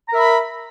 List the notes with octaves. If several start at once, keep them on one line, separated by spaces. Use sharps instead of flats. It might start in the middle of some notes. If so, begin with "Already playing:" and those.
A#4 E5 A#5 B5